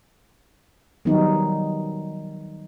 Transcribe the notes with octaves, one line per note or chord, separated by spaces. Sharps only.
D#3 F#3 G3 B3 D#4